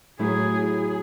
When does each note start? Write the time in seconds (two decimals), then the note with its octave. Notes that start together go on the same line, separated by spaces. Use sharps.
0.19 A2 F#3 A3 E4 G#4
0.66 G#4